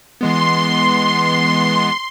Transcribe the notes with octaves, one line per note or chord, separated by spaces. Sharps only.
E3 G#3 B3 C6